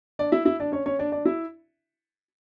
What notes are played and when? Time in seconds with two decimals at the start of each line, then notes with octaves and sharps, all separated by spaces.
0.19 D4 D5
0.32 E4 E5
0.45 E4 E5
0.60 D4 D5
0.72 C#4 C#5
0.86 C#4 C#5
0.99 D4 D5
1.12 D4 D5
1.25 E4 E5